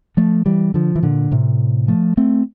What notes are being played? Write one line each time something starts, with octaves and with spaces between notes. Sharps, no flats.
F3 A3
E3 G3
D3 F3
E3
A#2 D3
A2 C3
F3 A3
A3 C4